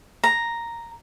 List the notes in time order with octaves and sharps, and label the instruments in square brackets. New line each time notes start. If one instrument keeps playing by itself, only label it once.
[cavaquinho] A#5